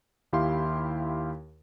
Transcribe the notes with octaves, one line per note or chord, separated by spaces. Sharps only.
D#2 E4 G4 F5 C6